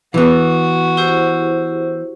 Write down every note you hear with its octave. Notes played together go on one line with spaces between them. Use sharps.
E3 B3 F#4
E4 G4 C5